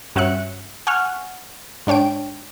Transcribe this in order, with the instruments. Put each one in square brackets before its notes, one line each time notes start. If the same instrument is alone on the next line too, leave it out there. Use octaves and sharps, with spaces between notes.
[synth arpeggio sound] G2 C#4 F#4 E5 F#6 C#7
F#5 G#5 C#6 F6 F#6
G#2 D4 C#5 G5 D7